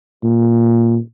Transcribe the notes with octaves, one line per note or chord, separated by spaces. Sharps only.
A#2